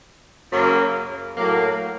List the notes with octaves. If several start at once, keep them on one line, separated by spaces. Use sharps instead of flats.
F#2 C#3 F#3 A#3
A2 F#3 A#3